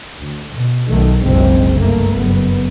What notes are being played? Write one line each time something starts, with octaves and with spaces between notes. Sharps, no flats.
D2
B2
B1 D#3 A3
F#1 C2 A2 D3 G#3 C4
G2 A3 A#3
F#1 B3